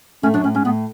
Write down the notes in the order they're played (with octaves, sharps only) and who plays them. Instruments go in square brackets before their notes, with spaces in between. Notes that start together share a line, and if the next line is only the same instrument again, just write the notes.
[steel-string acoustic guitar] A2 A3 [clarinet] C#4
[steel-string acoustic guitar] F#2 F#3 [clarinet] D4
[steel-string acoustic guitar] A2 [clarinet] C#4
[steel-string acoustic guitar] G#2 [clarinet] C#4
[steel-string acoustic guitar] A2 [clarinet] B3